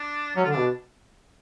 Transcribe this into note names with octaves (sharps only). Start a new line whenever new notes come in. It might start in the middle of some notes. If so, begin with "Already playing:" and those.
Already playing: D4
F#3 C#4
F4
D3 D4
B2